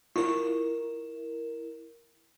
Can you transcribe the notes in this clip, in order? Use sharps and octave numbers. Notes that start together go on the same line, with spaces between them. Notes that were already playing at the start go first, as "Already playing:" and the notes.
E4 F4 A#4